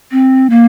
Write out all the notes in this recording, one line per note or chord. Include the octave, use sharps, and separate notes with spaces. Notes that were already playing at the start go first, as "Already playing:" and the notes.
C4
A#3